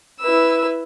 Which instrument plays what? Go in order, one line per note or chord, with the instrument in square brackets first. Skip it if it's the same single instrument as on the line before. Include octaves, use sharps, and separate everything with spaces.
[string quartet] E4 B4 E6